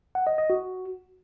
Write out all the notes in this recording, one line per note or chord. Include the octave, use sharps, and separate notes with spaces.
F#5
D#5
D#5
F#4